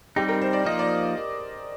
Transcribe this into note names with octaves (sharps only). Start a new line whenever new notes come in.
G3 C4 D#4 G4
A#4
C5
D5
F3 A#3 D#4 D#5
D5